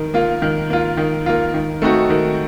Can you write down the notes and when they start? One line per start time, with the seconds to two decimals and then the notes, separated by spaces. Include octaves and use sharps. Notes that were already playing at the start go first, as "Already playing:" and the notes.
Already playing: D#3
0.14 A#3 F4
0.42 D#3
0.70 A#3 F4
0.97 D#3
1.26 A#3 F4
1.54 D#3
1.82 A3 C4 D#4 F#4
2.10 D#3